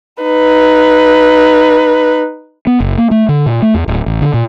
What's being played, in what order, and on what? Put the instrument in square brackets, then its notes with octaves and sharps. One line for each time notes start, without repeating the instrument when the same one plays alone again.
[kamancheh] D#4 B4
[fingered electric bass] B3
F#1
A#3
A3
D3
A#2
A3
E2
D1
A1
D3
A#2